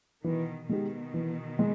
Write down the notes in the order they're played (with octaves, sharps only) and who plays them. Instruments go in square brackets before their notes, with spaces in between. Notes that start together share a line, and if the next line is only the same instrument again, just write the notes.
[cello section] B2 D#3 [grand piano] E3
[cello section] B2 D#3 [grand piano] G#3 D#4 G4
[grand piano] E3
G#3